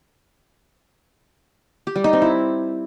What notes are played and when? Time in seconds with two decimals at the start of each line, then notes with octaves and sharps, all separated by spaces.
1.87 G4
1.96 G3
2.04 D#4
2.13 C4
2.22 E4